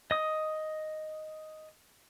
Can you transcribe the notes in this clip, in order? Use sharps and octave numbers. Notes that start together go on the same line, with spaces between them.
D#5 D#6